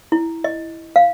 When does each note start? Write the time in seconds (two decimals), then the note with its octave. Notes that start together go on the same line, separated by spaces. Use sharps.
0.12 E4
0.44 D#5
0.96 F5